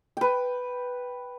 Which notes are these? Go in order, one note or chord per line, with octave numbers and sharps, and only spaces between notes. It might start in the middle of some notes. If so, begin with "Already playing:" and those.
B4 G5